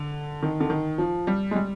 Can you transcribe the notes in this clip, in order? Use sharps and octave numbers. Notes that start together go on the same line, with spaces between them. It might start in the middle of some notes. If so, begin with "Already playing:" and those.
Already playing: D3
D#3
D3
D#3
F3
G3
G#3
G3